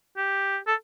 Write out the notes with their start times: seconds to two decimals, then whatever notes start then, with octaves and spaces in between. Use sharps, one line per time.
0.17 G4
0.67 A4